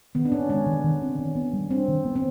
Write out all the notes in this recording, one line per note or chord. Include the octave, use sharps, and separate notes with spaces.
D#3 B3
D4
C4 C#4
G#3 C#4
D#3
D#3
C4
D#3
B3
G3
C4 D4
D#3
B3
C4